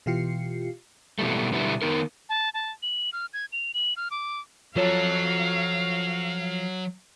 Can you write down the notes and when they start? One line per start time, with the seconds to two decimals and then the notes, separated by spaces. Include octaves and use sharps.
0.06 B2 E3 F4 G4 C7 C#7
1.19 B2 E3 G3 A3
1.52 B2 D3 G3 B3 E4
1.82 D#3 B3 D#4 A#4
2.29 A5
2.54 A5
2.83 F#7
3.13 F6
3.34 G#6
3.53 F7
3.74 F#7
3.97 F6
4.11 D6
4.76 F3 F#3 F4 A4 C#5 F5 A5